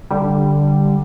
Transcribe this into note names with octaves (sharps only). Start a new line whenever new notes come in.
D3 G3